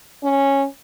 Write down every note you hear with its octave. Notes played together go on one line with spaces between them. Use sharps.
C#4